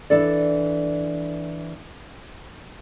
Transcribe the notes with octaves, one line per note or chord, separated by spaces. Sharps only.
E3 D4 A4 D5